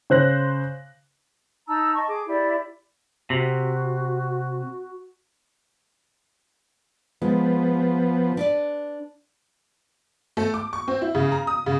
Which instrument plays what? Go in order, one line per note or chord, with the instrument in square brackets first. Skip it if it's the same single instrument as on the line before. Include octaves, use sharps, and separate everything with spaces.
[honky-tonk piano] C#3 C5 F#6 A#6
[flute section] D#4 A5 A#5 E6
D#5 A5 C#6
G#4 D6
E4 G4 D5
[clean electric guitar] C3 [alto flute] F#4
[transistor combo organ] F3 B3 [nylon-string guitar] G#3
[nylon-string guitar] D4 B4 D5
[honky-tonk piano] A3
D6
C#6
C4
E4
C#3
A#5
D#6
C#3